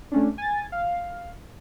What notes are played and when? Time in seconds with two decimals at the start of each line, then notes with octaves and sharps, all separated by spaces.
0.12 A3 C#4 D4
0.38 G#5 A6
0.72 F5